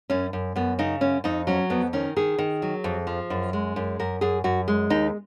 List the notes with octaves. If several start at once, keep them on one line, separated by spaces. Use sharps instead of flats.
F#2 C#4
F#2
F#2 B3
C#3 D#4
F#2 C#4
F2 D#4
F#3 C#4
F2 B3
D#3 C#4
D#3 G#4
D#3
F#3
F2
F3
F#2
G#3
F#2
F#2 A#4
F#2 G#4
F#2 F#4
G#3
D#2 D#4